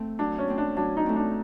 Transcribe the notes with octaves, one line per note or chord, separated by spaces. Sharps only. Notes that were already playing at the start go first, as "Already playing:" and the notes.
Already playing: A3 C4
F#3 D4
C#4
A3 C4
D4
F#3 D4
D#4
A3 C4
D4